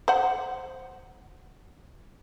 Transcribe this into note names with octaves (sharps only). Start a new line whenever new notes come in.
C5 F#5